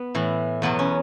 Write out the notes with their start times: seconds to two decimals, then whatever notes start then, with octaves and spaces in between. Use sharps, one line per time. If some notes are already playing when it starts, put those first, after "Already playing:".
Already playing: B3
0.15 A2 E3
0.62 E2 B2 F#3 B3
0.79 C#4